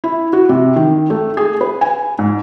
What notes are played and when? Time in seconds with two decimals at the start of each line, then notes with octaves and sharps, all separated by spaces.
0.04 E4
0.33 F#4
0.49 C3
0.76 D#3
1.10 A3
1.37 G#4
1.61 B4
1.81 G#5
2.19 G#2